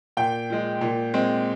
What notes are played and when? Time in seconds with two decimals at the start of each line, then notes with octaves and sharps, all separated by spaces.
0.17 A#2 G5
0.50 F3 G#3
0.81 A#2
1.14 G#3 C4